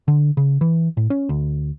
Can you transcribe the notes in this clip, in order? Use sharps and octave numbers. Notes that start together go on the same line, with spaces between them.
D3
C#3
E3
A2
C#4
D2